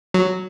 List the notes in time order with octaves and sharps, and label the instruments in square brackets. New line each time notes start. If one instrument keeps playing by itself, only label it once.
[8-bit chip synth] F#3